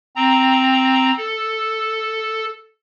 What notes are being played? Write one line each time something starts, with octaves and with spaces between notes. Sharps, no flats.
C4 A#5
A4